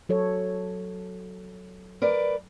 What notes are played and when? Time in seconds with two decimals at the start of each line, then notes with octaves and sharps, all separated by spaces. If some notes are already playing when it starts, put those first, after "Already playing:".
0.09 F#3 A4 C#5
2.02 A#4 B4 D5